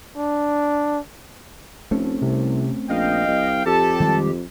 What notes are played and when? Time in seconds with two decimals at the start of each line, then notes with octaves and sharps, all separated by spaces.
0.17 D4
1.91 F1 A3 C4 C#4
2.21 C2 C3
2.89 A#1 D#5 F5 G5
3.27 C2
3.66 F2 G4 A4 A5
4.00 D#3 G3 G#3